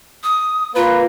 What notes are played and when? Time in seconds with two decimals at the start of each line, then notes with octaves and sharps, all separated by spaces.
0.23 D#6
0.76 A#3 F4 B4